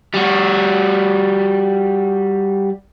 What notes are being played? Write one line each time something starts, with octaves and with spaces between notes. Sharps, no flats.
G3 F#4